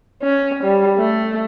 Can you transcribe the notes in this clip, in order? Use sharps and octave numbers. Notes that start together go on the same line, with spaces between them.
C#4
G3
A3